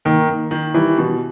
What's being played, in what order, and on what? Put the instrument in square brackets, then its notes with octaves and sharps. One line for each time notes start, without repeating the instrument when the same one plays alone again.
[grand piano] D#3 [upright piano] A#3
[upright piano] A#3
D#3
[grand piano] E3 [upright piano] G3
[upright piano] B2